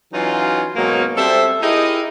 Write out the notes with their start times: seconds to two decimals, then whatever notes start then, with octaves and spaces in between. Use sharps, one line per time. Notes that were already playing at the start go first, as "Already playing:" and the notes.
0.13 E3 F#3 C#4 D#4 F4
0.76 G#2 B2 F#3 A#3 C#4 D#4
1.17 G3 C4 A4 C5 E5
1.62 D#4 E4 G4 G#4 A#4 D#5